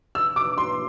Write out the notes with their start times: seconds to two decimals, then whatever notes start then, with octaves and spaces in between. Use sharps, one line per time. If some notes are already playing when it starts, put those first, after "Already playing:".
0.15 E6
0.36 D6
0.58 C6